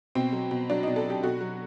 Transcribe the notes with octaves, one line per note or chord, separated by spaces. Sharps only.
B2 C4
F#3
B2
F#3 D4
B2 D#4
A4
F#3 G4
B2 F#4
F#3